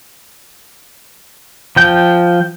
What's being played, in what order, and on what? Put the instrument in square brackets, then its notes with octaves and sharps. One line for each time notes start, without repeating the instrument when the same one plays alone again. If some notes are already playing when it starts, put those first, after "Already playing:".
[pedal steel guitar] F3 G5